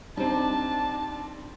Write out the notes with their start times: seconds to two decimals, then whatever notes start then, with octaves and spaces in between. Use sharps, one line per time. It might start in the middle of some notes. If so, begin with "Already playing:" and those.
0.17 G3 C4 D4 D#4 C5 A5